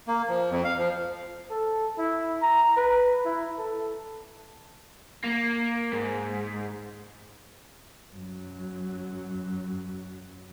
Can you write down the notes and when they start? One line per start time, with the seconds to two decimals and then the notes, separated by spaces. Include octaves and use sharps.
0.08 A#3
0.29 F3
0.51 F2
0.64 F5
0.78 F3
1.51 A4
1.98 E4
2.42 A#5
2.77 B4
3.25 E4
3.58 A4
5.24 A#3
5.93 G#2
8.13 F#2 F#3